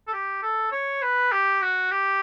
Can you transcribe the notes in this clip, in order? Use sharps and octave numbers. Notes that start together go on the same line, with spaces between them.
A4
G4
A4
C#5
B4
G4
F#4
G4